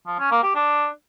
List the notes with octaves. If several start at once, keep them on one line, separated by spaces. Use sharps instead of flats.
F3
C#4
A#3
G4
D4